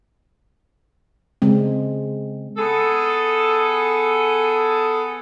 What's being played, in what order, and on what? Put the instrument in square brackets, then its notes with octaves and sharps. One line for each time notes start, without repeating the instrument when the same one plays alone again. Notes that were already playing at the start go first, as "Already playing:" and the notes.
[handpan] C#3 G#3 C4
[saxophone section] B3 G#4 A4